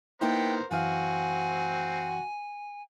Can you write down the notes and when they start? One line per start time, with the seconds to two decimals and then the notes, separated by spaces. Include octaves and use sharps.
0.21 A#3 B3 D#4 E4 A#4 C5 G5
0.71 F#2 E3 C4 F#4 F5 G#5